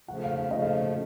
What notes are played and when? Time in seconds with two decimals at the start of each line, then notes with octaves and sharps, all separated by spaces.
0.08 C#3 F3 A3 F#5
0.24 F5
0.38 F5
0.51 C#3 F3 A3 D#5
0.62 F5